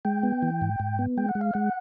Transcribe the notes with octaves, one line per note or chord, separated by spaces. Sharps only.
G#3 G5
B3
E3
G#2
G#2
B3
G#3 G5
F#5
G#3
F5
G#3 F#5